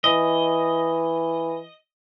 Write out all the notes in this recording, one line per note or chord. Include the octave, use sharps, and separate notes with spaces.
E3 D#5